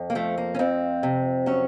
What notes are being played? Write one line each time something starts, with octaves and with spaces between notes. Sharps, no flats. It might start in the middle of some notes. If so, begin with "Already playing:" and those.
Already playing: F2
A#3
F3 A3
A#3
C#4
F2 C4
C3
F#3 C#4